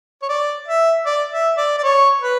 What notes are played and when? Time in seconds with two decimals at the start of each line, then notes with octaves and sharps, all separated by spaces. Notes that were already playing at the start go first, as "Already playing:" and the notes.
0.22 C#5
0.29 D5
0.67 E5
1.06 D5
1.33 E5
1.57 D5
1.78 D5
1.83 C#5
2.22 B4